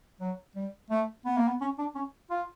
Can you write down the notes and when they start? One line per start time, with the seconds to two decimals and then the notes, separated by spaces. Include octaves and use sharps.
0.20 F#3
0.55 G3
0.90 A3
1.25 B3
1.37 A#3
1.48 B3
1.61 C#4
1.78 D4
1.95 C#4
2.30 F4